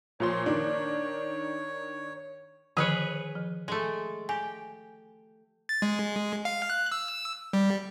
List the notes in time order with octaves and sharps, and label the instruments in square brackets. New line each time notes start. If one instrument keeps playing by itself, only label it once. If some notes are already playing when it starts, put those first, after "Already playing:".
[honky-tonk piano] A#2 F3 C6 [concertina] C#5
[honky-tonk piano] D#3 D4
[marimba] D3 D#3 F3 [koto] G#4 B4 C#5
[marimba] F3
[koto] G#3 A3
[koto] G4 [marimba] G#5
[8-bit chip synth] A6
G#3
F5
F#6
E6
G3